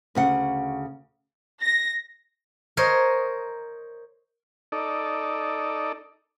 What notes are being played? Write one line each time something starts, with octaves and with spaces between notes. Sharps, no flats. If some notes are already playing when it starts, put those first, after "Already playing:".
D2 C#3 F#5
A#6
A#4 C5 C#5 D#5
D#4 A4 D5